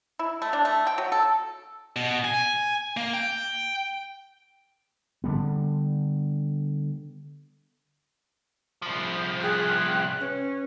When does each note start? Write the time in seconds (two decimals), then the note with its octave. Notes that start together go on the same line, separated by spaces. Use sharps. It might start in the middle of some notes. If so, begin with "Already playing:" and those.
0.19 E4
0.42 A3
0.53 D4
0.65 A3
0.87 G5
0.98 F#3
1.12 A4
1.96 B2
2.24 G#5
2.97 A#3
3.13 G5
5.24 D3 G3 B3
8.82 C2 F3
9.43 G#4 G5 F#6
10.20 C#4 B4